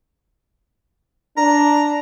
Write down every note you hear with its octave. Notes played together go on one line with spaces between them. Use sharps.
D4 A#5